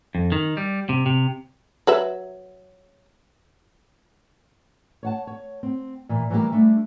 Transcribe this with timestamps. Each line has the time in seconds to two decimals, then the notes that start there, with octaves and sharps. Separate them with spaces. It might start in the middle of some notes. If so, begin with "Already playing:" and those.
0.15 F2
0.32 D#3
0.57 G3
0.89 C3
1.06 C3
1.87 F#3 B4 E5
5.03 C#5 F#5 A5
5.27 C#5
5.63 C4
6.09 A#2 E3
6.30 E3 F#3 G3 A3 A#3 G4
6.52 G3 A3 D4